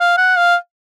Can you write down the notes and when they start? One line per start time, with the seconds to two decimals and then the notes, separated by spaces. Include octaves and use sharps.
0.01 F5
0.18 F#5
0.37 F5